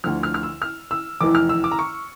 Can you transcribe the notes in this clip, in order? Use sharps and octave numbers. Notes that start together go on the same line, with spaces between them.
D2 D3 F3 F6
F6
F6
E6
F6
E6
F1 E2 E3 D6
F6
E6
D6
A#5
C#6